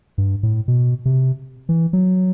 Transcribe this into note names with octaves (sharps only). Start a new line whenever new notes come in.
G2
A2
B2
C3
E3
F#3